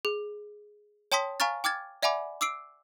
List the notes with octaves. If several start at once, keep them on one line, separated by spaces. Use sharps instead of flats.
G#4
C#5 G5 A5 C6 D#6 B6
F5 G#5 A#5 C#6 F6 A6
G5 D6 F6 G#6 A6
D5 E5 F#5 G#5 B5 D6
D6 E6 C7 D7